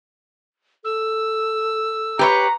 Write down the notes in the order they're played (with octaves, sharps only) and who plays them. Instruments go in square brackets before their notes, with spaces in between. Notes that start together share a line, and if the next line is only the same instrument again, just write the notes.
[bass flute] A4 [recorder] E6
[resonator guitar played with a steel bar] G4 B4 C#5 [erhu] A#5